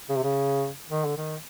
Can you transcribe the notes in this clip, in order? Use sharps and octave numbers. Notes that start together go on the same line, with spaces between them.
C#3
C3
C#3
D#3
D3
D#3